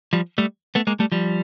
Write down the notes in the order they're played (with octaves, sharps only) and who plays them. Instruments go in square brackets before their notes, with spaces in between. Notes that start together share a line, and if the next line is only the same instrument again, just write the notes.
[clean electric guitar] F3 G3
G3 A3
A3 B3
G#3 A#3
G3 A3
F3 G3